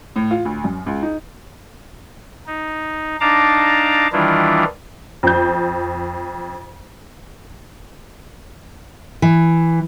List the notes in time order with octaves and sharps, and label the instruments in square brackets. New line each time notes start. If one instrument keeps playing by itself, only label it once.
[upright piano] A2
F4
D2
F#2
C#2
D#4
[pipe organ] D#4
D4 D#4 F5 A5 A#5 D6
D#3 E3 G3 D4 E4 F4
[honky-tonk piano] F2 G6
[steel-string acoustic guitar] E3